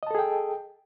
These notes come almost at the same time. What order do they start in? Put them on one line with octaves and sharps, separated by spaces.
D#5 A5 A4 G#4 G5